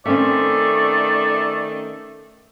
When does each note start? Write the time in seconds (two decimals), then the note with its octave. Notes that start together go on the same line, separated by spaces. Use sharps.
0.06 D#3 A3 C4 C#4 D5 E5